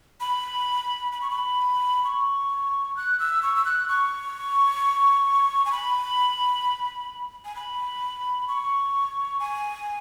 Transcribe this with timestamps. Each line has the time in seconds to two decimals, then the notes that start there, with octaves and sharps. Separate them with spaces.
0.20 B5
1.12 B5
1.21 C#6
1.30 B5
2.04 C#6
2.97 F#6
3.19 E6
3.42 C#6
3.56 E6
3.65 F#6
3.88 C#6
5.65 G#5
5.72 B5
7.45 G#5
7.55 B5
8.48 C#6
9.40 G#5